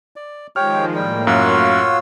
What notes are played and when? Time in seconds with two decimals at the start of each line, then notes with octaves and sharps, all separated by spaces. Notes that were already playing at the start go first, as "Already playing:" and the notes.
0.16 D5
0.56 D#3 F3 G#3 G4 C#5 G5 F6
0.95 A2 G3 A#3 G5
1.27 F#2 F4 F#4 C#5 F5 E6